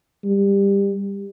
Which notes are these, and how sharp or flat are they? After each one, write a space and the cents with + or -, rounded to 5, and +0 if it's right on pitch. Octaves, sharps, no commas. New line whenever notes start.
G3 +20